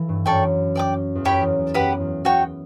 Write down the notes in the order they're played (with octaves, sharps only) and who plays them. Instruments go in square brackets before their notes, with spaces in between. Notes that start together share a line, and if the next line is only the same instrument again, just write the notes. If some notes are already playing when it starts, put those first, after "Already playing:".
Already playing: [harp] E3
G2
[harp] F#2 [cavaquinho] A4 D5 G5 C#6
[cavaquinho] D5 G5 D6
[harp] E2
[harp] F#2 [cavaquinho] G4 C#5 G5 B5
[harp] E2
E2
[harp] F#2 [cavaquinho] G4 B4 F#5 B5
[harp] E2
[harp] E2 [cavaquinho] F#4 C#5 G5